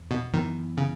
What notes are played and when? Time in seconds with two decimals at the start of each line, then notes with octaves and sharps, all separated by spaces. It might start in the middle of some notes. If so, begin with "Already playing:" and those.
Already playing: E2
0.11 B2
0.33 F#2 D#3 E3 B3
0.77 C#3